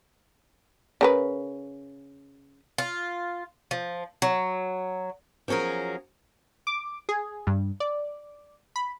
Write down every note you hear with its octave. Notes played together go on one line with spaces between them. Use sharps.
C#3 A#4 B4
F4
F3
F#3
F3 F#3 C#4 G#4 A#4
D6
G#4
G2
D5
B5